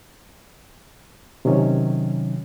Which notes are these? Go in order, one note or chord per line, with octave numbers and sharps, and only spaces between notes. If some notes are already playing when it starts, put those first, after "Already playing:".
C3 D#3 F#3 C#4